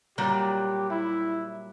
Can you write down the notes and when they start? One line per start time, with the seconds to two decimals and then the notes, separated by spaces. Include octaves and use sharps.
0.18 A#2 F#3 G3 G4
0.91 E4